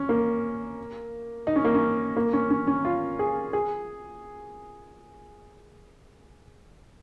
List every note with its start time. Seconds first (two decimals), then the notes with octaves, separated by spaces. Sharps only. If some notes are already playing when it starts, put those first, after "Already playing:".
Already playing: C#4
0.09 A#3
1.47 D#4
1.56 C#4
1.65 A#3
1.74 C#4
2.17 A#3
2.33 C#4
2.50 C#4
2.67 C#4
2.85 F4
3.19 G#4
3.53 G#4